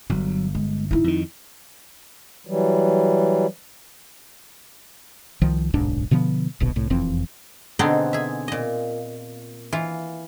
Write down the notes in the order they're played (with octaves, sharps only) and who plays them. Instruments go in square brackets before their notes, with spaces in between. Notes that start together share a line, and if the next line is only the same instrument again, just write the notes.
[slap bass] G1 [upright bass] F#3
[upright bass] G#3
D#4 E4
[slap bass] F2 D#3
[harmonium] E3 F#3 G3
[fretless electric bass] C2 D#3 F3
D1 B1 G#2 D4
B2 D3 F3 B3
D1 A#1 B2
C2 A2
E1 F2 E3 C4
[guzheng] B2 D3 B3 C4 D#4 G#4
G#4 E5
A#2 D#5
E3 F4